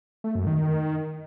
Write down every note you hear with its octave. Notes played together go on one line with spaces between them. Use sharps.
A3
F#2
D#3